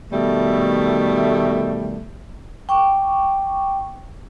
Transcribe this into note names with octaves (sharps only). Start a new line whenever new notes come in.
B2 D#3 G3 A3
G5 C#6 D6